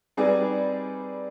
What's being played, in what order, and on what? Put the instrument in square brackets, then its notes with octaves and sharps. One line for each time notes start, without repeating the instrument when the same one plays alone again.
[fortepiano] G3 C4 D#4 G#4 B4 D5